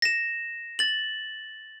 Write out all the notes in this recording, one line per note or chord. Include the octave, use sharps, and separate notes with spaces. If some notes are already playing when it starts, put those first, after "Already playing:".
A#6 E7
A6 F#7